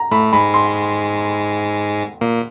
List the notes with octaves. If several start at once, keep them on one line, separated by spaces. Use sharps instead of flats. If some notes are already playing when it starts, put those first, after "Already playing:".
Already playing: A#5
A2 A3 B5
G#2 G#3 B5
C6
A#2 A#3